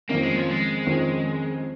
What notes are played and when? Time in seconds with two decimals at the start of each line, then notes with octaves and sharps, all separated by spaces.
0.09 F2 D#3 A#3 C#4
0.22 G#3
0.36 F3
0.50 G#3
0.86 F2 D#3 C#4